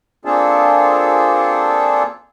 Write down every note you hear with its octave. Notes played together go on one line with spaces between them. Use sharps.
A#3 C4 D4 F4 G#4 A4